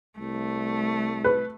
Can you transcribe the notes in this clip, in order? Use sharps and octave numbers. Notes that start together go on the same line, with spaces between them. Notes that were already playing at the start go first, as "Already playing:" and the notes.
C2 A3
B4